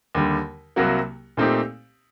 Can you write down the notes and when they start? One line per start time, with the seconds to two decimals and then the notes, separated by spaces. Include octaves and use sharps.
0.15 D#2 D3 G3
0.76 C2 C3 F#3 A#3 F#4
1.37 A#2 A3 C4 D#4 G4